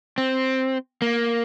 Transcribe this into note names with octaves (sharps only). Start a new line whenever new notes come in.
C4
A#3